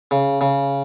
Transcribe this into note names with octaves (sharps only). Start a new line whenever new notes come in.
C#3
C#3